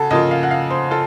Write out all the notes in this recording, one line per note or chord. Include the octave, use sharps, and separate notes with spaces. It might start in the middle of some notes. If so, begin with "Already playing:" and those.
Already playing: C#3 F#4 A4
C#3 F3 A#3 F4 D#5
F5
F#5
F5
C5
F4 A4